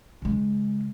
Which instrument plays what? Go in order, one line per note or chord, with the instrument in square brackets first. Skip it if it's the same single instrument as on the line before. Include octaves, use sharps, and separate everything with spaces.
[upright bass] C#3 G#3